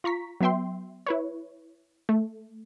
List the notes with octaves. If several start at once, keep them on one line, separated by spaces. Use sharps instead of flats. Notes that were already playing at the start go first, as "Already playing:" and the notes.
F4 A#5 C#6 B6
F#3 B3 E5 G5 C6
E4 B4 C#5
A3